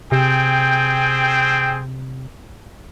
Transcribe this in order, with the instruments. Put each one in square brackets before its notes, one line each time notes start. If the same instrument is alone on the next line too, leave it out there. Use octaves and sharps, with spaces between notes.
[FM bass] C3 [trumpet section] C4 G#4 G5